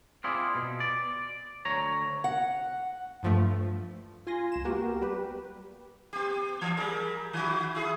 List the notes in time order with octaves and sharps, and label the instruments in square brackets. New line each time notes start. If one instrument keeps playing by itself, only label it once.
[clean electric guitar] C4 E4 F4 G#4 D5
B2
D5
D2 C#5 A#5
[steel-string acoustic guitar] F#5
[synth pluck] G2 F3 A3
[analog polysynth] F4 G#5 C6 A#6
C#2 E7
A#3 B3 F#4 G4 A#4
G3 G4 B4
[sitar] B3 G4
E3
G3 G#4 A#4
D#3 F#4
E4 G#4